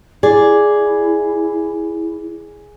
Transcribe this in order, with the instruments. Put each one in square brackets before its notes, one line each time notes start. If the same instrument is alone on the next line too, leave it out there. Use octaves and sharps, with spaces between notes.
[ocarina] E4 [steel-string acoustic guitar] G#4 D5